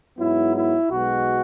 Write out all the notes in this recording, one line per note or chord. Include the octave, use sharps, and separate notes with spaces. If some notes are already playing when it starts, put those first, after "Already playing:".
G#2 F#3 B3 E4
E4
B1 B2 G#3 F#4